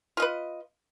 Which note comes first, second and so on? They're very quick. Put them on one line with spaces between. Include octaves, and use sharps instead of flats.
F4 D#5 B4